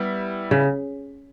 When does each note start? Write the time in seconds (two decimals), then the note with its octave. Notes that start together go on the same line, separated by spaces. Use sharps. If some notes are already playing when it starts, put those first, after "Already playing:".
Already playing: G3 B3 E4
0.51 C#3